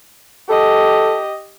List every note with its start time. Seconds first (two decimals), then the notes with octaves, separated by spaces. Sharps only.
0.50 G4 A4 D#5